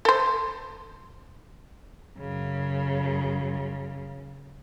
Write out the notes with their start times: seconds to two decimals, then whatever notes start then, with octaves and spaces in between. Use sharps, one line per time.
0.05 A4 C5
2.20 F#2 C#3